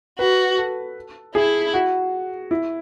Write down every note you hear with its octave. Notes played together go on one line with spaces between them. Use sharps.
F#4 B4
A4
E4 G#4
F#4
E4